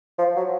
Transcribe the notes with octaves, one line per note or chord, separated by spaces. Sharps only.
F3
F#3